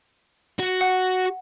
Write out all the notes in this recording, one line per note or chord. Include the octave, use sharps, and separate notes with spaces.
F#4
F#5